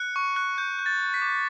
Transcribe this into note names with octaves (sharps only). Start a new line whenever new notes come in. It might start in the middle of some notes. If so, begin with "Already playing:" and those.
Already playing: F#6 C#7
C#6
F#6
G6
G6
A6
G6
B6
D6